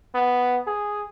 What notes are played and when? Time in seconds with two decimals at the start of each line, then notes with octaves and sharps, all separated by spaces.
0.15 B3
0.67 G#4